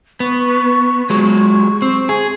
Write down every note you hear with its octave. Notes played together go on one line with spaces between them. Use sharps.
B3 C#6
F#3 G#3
C4
G#4